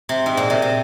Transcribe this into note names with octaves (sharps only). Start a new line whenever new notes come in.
C3
G#2
A#2
C3
C3